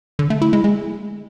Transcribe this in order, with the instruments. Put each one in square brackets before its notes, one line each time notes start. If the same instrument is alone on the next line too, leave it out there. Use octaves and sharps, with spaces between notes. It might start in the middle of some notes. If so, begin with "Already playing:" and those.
[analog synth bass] D3
A3
E4
G#3
G#3